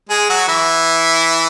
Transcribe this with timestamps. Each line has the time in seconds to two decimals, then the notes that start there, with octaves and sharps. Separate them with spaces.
0.09 G#3 G#4
0.29 F#3 F#4
0.48 E3 E4